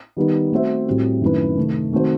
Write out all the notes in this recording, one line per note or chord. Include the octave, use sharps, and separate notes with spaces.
D#3 G3 B3 D#4
A3 C4 F#4 C5 E5
A2 G3 C4 F#4
F#2 D#3 A3 E4 B4
C3 D#3 A3
D#3 A3 C4 F#4 C5